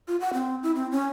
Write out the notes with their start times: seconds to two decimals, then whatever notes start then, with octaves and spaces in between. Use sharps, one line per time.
0.08 F4
0.20 F#5
0.34 C4
0.63 E4
0.76 C4
0.91 C#4